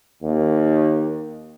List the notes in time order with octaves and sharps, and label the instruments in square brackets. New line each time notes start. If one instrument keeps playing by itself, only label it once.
[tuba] D#2